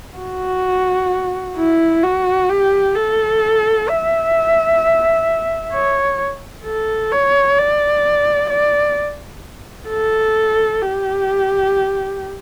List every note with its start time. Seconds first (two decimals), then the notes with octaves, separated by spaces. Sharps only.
0.18 F#4
1.57 E4
2.03 F#4
2.49 G4
2.95 A4
3.89 E5
5.73 C#5
6.65 A4
7.12 C#5
7.59 D5
8.50 D5
9.89 A4
10.82 G4